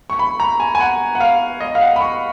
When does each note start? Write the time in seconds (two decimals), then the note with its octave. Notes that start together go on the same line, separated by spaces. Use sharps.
0.10 C#6
0.19 B5
0.40 A#5
0.60 G#5
0.75 G#5
0.80 F#5
1.15 F#5
1.20 F5
1.61 D#5
1.75 F5
1.81 F#5
1.96 B5
2.01 C#6